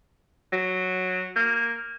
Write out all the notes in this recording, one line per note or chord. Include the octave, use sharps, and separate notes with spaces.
F#3
A#3